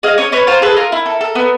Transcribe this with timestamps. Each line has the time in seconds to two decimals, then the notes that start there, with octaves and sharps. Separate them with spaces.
0.03 G#4 D#5 F5
0.18 C#4 C#5 D#5
0.32 C#4 B4 C#5
0.47 F4 A#4 C5
0.62 G#4 A4 B4
0.77 F4 A#4
0.92 E4
1.06 A4
1.21 A4
1.35 B3